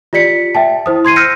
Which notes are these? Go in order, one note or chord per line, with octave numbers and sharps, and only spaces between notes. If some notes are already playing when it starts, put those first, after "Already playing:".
F4 G4 D5 B6 C#7
E5 G5 A5
E4 C5 D#6
C6 G#6 C7 D#7
E6 F6 G6 A#6 C#7 D#7